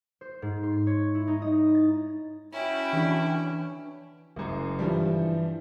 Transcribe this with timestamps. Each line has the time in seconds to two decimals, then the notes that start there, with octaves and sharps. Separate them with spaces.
0.21 C5
0.42 G#2
0.63 C6
0.87 C#5
1.15 E4
1.27 D#4
1.42 D#5
1.75 A6
2.53 C#4 E4 F#4 G5 B5
2.93 E3 D4
4.36 F#1 F#2
4.79 G2 E3 F3 G3